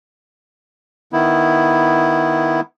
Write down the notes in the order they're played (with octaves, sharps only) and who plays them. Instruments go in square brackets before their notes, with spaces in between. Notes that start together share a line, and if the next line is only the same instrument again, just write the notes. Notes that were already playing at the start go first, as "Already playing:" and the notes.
[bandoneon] D#3 B3 E4